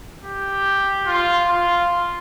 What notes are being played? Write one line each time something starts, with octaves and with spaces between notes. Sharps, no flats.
G4
F4
F4